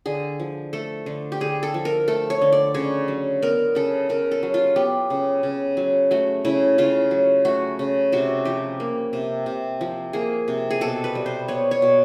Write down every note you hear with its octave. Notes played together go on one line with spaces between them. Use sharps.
D3 G#4
F3
A3 A4
D3
G4
D3 G#4
A4
F3
A#4
A3 A4
C#5
D3
D5
C#3 C#5
F#3
B3 A#4
C#3 A4
C#3 A#4
A4
F#3
F4
B3 G4
C#3
C#3
F#3
A3 F#4
C#3 E4
C#3 F4
F#3
A3 F#4
C#3
C3 F#4
F3 G4
A#3
C3
C3
F3
A#3 G#4
C3
G#4
B2 A4
B4
G3
C5
B3 C#5
C#5
B2